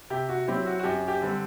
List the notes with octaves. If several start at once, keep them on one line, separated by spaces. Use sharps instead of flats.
C3 G4
F#4
F#3 C4 E4 G4
F#4
F#4
F#2 G4
G4
D3 G3 C4